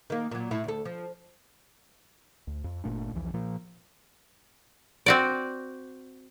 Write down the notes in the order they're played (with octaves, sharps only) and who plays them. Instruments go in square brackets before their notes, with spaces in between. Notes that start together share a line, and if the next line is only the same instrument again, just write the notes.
[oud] D#3 A#3
A#2 F#3
A2 E4
D2 A4
F3
[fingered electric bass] D2
F2
G1 A#2 A3 D4
B1 E2 E3 F3
A#2 F3 A#3
[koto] C4 F#4 D5